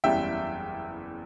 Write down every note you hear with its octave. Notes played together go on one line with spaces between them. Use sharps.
F#1 E2 C#3 G3 E5 G5